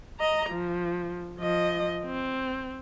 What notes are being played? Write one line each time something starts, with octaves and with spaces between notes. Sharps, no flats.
D#5 A#5
F3
F3 D#5
C4